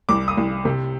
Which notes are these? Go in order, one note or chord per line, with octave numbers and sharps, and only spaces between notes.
C2 D6
D#6
C2
C3